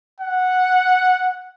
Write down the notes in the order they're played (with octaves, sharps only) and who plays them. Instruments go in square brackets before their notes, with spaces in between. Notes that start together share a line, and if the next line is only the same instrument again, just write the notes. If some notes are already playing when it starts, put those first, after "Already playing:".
[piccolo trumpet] F#5